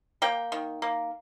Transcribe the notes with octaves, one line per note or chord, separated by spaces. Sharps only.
A#3 G5
D#3
A#3